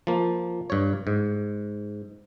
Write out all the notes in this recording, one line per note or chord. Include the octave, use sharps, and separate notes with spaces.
F3 A#3
G2 C#5
G#2